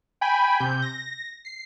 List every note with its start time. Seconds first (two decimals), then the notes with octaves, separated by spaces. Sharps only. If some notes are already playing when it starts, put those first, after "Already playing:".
0.21 G5 G#5 B5
0.60 C3 G6
0.82 A#6
1.45 C7